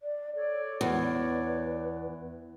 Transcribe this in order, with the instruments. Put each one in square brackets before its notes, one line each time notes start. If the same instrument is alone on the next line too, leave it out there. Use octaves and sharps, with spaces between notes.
[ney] D5
[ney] A4 [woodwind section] C#5 D5
[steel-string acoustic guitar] E2 [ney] B4